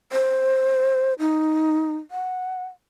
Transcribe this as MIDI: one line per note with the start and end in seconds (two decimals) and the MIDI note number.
0.12 1.14 72
1.19 1.97 63
2.11 2.65 78